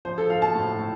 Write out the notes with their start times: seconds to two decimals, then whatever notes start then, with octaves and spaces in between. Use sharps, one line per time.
0.05 F3 C5
0.18 A4
0.30 F3 F5
0.42 A5
0.54 A2
0.79 A2